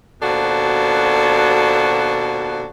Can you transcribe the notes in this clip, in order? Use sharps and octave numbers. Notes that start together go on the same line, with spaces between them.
D#2 B2 F3 D4 F#4 A4